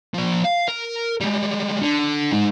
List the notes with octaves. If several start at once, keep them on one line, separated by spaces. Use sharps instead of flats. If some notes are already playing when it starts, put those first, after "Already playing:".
F3 D5
F5
A#4
G3 G#3
D3
G#3 D#4